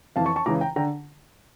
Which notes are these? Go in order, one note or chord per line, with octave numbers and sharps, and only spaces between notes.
F2 E3 F5 A5
A5 C#6
A5 C#6
C#2 C#3 E3 A#5 D6
G5 A#5
D3 G5 A#5